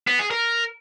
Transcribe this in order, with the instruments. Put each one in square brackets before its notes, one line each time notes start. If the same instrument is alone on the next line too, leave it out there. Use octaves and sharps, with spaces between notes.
[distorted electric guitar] B3
G#4
A#4